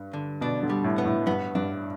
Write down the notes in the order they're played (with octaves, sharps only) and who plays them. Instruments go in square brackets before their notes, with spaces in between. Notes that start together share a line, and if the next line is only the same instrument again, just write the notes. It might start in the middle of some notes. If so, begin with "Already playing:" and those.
Already playing: [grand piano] G2
[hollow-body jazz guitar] D3
[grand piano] B2 [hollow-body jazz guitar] D4
[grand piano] D3
[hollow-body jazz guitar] G3
[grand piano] A2
[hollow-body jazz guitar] B3
[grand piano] A2
[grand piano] G2 [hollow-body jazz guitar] B3
[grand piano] G2 [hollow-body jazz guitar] D4